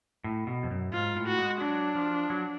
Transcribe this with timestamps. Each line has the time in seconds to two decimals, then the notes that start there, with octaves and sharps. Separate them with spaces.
0.24 A2
0.47 B2
0.63 F2
0.71 F#2
0.93 G#2 F4
1.15 A2
1.27 F#4
1.38 G#3
1.61 F#3 D4
1.95 F3
2.30 F#3